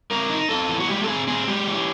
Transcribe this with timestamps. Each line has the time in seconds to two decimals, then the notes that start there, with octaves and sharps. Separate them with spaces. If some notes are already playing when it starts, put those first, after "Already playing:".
0.11 C4 A#4
0.30 D#4
0.49 C4 A4
0.69 E3
0.80 F#4
0.89 G#3 G4
1.03 A4
1.08 C4 G#4
1.28 C4 G#4
1.47 G#3 G4
1.67 E3